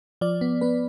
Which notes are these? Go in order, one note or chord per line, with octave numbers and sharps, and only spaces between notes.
F3 D5
B3
B3 B4